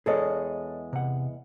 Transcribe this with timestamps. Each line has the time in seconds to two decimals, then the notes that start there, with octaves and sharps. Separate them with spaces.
0.06 E2 G#3 G#4 A4 C#5 D#5
0.93 C3 F#5